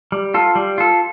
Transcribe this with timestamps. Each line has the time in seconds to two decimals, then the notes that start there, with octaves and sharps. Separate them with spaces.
0.12 G3
0.34 F4 A4
0.55 G3
0.78 F4 A4